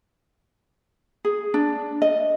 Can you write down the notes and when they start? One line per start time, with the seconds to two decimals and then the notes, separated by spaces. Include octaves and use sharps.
1.25 G#4
1.54 D4
2.02 D#5